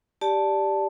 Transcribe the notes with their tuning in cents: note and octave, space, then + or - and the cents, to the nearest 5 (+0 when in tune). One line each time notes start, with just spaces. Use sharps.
G4 +0 D5 +0 A5 +0